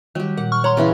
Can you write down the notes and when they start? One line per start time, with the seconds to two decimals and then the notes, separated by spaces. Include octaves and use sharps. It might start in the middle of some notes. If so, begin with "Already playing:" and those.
0.15 D#3 F#3 G3 G4
0.37 A#2 F#5
0.52 C#6 F6
0.64 C#5 F#5 A#5 C6
0.77 C#3 E3 C#4